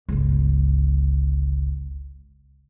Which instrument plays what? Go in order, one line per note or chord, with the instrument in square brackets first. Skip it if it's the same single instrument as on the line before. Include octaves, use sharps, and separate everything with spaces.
[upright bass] G1 C#2